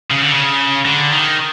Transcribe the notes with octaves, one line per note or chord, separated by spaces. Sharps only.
C#3
D3
C#3
D3
D#3